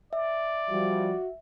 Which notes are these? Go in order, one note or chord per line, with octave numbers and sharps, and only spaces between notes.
D5 E5
F3 G3 F#4